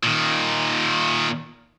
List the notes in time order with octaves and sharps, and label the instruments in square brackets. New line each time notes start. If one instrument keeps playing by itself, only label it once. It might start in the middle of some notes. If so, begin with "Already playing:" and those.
[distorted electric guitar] A#2 D#3